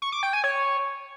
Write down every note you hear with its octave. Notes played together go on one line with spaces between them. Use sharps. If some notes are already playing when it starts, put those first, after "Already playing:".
C#6
D6
G5
G#5
C#5